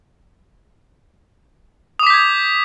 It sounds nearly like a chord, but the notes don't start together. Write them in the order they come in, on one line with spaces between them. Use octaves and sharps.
D#6 D6 B6 G6 G#6